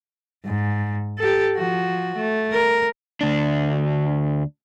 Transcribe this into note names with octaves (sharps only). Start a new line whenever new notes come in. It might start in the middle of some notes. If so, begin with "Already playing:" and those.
G#2
G4 A4
F3 F#4
A3
A#4
D2 D4